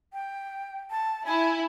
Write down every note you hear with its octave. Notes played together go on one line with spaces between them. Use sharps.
G5
A5
E4 G#5